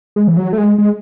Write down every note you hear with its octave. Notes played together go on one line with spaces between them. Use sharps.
G#3
E3
F#3
A3
G#3
G#3